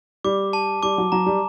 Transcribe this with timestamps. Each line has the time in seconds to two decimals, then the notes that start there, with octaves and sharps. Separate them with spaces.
0.24 G3 D6
0.53 A5
0.83 G3 D6
0.98 F#3
1.12 F#3 A#5
1.26 G3